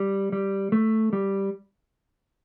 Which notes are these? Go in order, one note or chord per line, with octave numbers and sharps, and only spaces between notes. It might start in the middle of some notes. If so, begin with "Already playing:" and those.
Already playing: G3
G3
A3
G3